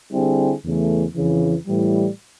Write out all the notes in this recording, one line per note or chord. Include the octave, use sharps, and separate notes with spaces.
D3 G3 C4 E4 G#4
E2 C#3 E3 A3
F2 C#3 E3
A2 E3 G3